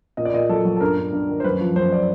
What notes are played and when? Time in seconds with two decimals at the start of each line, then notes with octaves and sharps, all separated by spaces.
0.17 A#2 D#5
0.25 D5
0.34 A#2 D#5
0.49 F#3 A4
0.65 F#3
0.76 A4
0.81 G2 A#4
0.97 G2
1.13 G2
1.29 D#3
1.40 C5
1.44 F#2 B4
1.60 F3
1.76 F#2 C5
1.92 D5